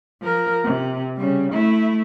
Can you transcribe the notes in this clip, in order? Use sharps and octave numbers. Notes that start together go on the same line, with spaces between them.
F3 A#4
C3
C#3 G3
A3 E4